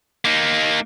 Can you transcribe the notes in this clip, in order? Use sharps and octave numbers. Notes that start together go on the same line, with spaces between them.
A#3 D#4